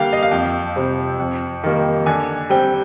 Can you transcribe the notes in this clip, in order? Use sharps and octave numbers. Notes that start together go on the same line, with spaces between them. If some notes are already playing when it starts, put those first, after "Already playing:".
Already playing: D3 G3 A#3 F5 G5
D#5
F5
F2 G5
C3 G3 C4
F2
D#3 G3 A#3
D3 G#5
G3 C4 G5